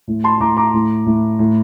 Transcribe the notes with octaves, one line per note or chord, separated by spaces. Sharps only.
A2
A5 C6
A2 A#5 D6
A#5 D6
A2
A2
A2